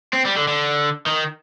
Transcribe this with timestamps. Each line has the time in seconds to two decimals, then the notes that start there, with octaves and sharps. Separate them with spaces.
0.13 C4
0.25 G3
0.36 D3
0.48 D3
1.06 D#3